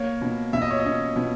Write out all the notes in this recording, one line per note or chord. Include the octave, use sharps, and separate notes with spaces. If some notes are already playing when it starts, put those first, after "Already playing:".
Already playing: A#3 C#5
B2
B2 E5
D#5
C#5
C#4 D#5
B2